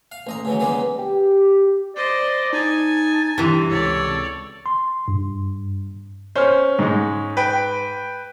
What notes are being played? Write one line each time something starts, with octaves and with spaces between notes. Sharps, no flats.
F5
A1 D#5 A#5
C#3 E3 F#3
C#3 E3 G3 G#3 A#3 B3
G4
C5 D5 D#5
D#4 G#5 A5
G2 C3 E3
C#2 A4 C#5 D5
C6
G2
C#4 C5 F6
G#2 G#3
B4 G5